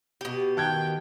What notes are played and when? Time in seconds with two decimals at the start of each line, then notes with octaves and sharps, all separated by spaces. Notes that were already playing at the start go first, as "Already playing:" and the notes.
0.21 B2 G4
0.57 D#3 G5 A5 F#6 G#6